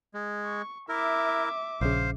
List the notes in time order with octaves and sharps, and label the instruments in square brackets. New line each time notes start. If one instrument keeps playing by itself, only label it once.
[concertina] G#3
[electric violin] C#6
[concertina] E4 A#4 [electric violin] E5 D6
[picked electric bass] A#1 C#3 [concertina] C5 F5